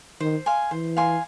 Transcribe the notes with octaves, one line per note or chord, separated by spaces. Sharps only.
D#3 C5
F5 G#5 C6
E3 C5
F5 G#5 C6